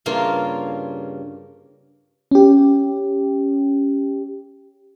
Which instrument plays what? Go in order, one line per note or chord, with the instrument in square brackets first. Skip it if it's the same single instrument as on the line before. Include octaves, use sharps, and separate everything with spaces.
[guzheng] G2 C#3 A#3 F4
[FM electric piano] C#4 G4